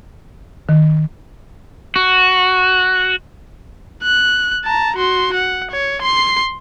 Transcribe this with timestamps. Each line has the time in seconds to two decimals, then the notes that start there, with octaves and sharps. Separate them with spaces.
0.69 D#3
1.96 F#4
4.03 F#6
4.64 A5 A#5
4.96 F#4 C6
5.34 F#5
5.71 C#5
6.02 C6 C7